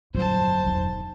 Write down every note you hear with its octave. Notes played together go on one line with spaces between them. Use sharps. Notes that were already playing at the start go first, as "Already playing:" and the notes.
G1 F2 A#2 F#3 C5 A5
E1 D#4